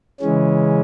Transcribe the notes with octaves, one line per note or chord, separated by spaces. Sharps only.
C#3 E3 G#3 C#4